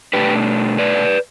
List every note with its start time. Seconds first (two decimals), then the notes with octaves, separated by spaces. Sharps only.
0.13 B2 A3 D4 G4 B4
0.78 B4 D5